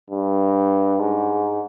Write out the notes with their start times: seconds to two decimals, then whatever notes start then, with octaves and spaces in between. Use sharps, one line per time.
0.11 G2
1.00 G#2